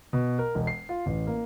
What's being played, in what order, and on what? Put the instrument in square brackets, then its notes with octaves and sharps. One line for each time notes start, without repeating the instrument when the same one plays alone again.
[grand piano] B2
A#4
E1
C7
F4
A1
A#3